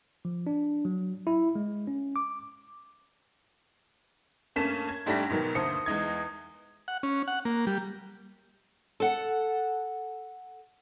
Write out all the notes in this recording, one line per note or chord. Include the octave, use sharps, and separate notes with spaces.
F3
D4
F#3
E4
G#3
C#4
D6
G2 A3 A#3 C#4 B6 E7
G#6
G#2 G3 A3 D4 A#6 B6
G#2 B2 D#3 F#3
D2 G2 A#3 C5 D#6 C#7
E2 G#3 D#4 G#6
F#5
C#4
F#5
A#3
G3
A4 F#5